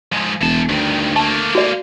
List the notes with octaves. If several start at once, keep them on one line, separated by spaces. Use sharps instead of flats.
F3 G#3
E1 E3 A5
D2 G2 D#3
A3 A#3 A5
F#4 D5